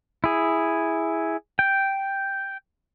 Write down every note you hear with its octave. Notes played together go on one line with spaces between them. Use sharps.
E4 G#4
G5